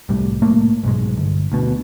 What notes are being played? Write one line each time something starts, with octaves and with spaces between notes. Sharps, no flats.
C2 A2 G3
A2 A3 A#3
B1 G#2 G#3
G1
D2 B2